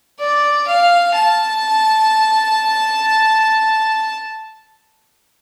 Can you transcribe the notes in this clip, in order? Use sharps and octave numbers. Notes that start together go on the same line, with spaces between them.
D5
F5
A5